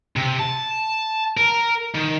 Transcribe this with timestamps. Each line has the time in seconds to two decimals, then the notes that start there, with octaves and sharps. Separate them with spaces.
0.16 C3
0.39 A5
1.37 A#4
1.95 D#3